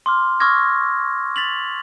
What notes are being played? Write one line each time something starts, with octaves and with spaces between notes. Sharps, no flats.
C6 D6 F6
C#6 D6 E6 F6 G#6 A#6
A6 B6 F7 F#7